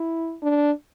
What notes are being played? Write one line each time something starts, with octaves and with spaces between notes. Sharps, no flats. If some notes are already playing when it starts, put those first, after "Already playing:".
Already playing: E4
D4